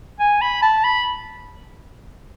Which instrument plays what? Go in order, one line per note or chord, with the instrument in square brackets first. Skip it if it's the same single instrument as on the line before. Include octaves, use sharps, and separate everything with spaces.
[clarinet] G#5
B5
A5
B5